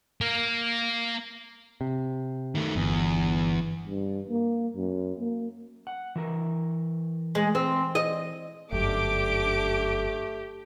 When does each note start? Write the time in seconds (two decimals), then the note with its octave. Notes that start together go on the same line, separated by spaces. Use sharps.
0.21 A#3 A#4
1.81 C3
2.55 D#3 A3
2.76 G1 E2
3.86 G2
4.29 A#3
4.76 F#2
5.19 A#3
5.87 F#5
6.16 E3 E4 A#4
7.35 G#3
7.55 C4
7.95 D#5
8.72 G1 F#2 A3 D4 G4 D6 D7